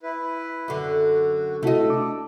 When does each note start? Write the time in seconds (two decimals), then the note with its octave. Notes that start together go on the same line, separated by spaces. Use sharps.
0.03 E4 B4
0.68 F#2 D3 F#4
1.63 C3 A3 E4 F#4 A4 D#5
1.89 D4 D6